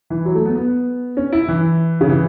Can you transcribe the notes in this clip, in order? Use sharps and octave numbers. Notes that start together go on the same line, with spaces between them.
E3
F#3
A3
B3
B3
C#4
E4
E3
C#3
E3